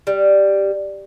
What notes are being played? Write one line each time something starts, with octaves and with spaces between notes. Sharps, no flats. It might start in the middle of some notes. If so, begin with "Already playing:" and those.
G3